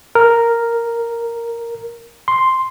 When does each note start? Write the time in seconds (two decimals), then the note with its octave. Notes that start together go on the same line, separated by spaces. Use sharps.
0.15 A#4
2.28 C6